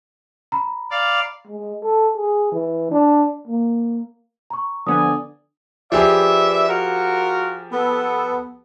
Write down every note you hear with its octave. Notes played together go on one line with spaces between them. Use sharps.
A#5 B5
D5 F5
G#3
A4
G#4
E3
D4
A#3
A#5 C#6
D3 F3 B3 D5 G#5 D#6
F3 G4 G#4 B4 D5 E5
F4 F#4 A#4
B3 A4